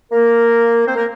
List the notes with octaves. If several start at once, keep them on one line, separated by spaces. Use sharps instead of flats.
A#3 A#4
C4 C5
A#3 A#4